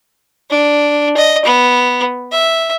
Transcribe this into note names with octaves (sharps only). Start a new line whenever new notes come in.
D4
D#5
B3
E5